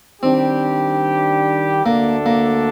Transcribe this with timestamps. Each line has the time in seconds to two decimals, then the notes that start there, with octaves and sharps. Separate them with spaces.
0.23 D#3 G3 C4 D4 G4
1.85 D2 D3 A3 A#3 D4 A4
2.26 A#3